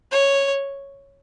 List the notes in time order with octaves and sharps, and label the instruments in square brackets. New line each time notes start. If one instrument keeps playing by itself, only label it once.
[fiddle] C#5